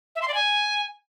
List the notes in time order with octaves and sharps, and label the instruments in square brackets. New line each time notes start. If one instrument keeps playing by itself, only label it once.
[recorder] E5
C6
D5
G#5